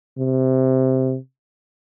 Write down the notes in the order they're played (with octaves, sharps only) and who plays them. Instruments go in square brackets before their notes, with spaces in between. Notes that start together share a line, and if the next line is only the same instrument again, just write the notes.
[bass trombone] C3